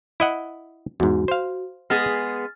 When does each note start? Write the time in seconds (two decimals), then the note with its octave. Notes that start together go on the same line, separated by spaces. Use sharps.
0.20 E4 D#5 F#5
1.00 E2 G#2 F#4
1.28 C5 F5
1.90 G#3 B3 G#4 F6 A6